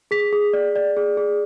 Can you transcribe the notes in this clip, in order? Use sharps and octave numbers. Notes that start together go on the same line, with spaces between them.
G#4 B6
G#4
D5
D5
G#4
G#4